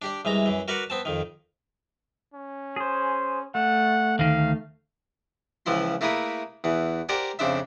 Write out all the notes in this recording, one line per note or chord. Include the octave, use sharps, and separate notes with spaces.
D4 G4 D5
C2 E3 G#3 A#5
F#2 E3
F#4 A#4 B4 D5 F#5
B3 C4 A5
F2 D#3
C#4
G#4 C5
A3 F#5
D2 D#3 F5
C#2 E3 F3 E4 C6
A3 A#3 E4 G#4 B4 G#5
E2 E3
G4 A#4 C5 D5 F#5 G#5
F2 C#3 D4 C5 E5